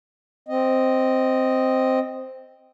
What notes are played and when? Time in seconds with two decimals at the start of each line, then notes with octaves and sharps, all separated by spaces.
0.48 C4 D#5